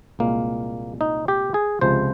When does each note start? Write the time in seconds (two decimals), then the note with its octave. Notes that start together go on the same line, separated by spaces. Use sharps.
0.19 C2 A#2 G#3 A#3
1.01 D#4
1.28 G4
1.54 G#4
1.81 C#2 C3 F3 G#3 C5